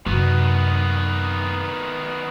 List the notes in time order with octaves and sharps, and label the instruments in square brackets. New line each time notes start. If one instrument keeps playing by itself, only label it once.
[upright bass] F#2 C3 [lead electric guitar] D#3 B3